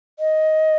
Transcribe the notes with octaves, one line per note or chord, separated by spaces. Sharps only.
D#5